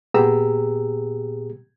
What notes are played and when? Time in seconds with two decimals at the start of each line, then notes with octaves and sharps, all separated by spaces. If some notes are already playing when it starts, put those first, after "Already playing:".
0.14 A#2 B3 G4 G#4 A#5 E6